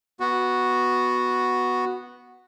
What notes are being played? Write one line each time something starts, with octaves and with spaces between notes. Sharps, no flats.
B3 F#4